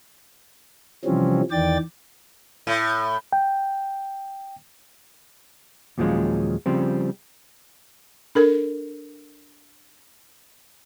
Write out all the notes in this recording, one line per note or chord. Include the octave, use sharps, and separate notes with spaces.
C3 E3 F3 G3 C4 C#4
E2 D#3 E3 D5 G5 A6
A2
G5
D#2 A#2 F3 F#3 G#3 C#4
C#3 F3 G3 C4
D4 A4 A#4